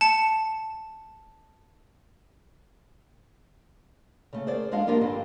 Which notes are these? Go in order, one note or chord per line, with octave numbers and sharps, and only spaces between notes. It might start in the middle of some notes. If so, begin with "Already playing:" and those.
A5 C#7
C#3 A3
G#4 A#4 C5 D5
F2 G#3 D4 F#4 D#5 F5
F3 A#3 D4 F4 G4 A#4
G2 D3 G3 C4 D#5 F5